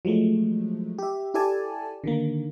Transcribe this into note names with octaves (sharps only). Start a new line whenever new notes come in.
F3 F#3 G#3 A3
G4 E5
E4 G4 A4 D5 G#5 A5
D3 D#3 A#3